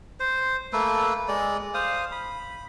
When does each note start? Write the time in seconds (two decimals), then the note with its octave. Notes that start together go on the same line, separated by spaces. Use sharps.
0.20 C5
0.73 A3 A#3 A4 B4
1.28 G#3 D5
1.74 C5 F5 D#6
2.12 B5